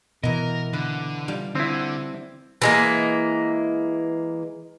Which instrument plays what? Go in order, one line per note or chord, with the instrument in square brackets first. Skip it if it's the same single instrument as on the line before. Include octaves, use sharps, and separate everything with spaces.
[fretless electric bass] B2 [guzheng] E3 B3 [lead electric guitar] A#4 [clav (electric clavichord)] D#5
[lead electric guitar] D3 [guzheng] B4
[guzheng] G3 F4
[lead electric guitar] D3 [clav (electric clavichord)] C4 E4
[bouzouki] E3 G#3 A#3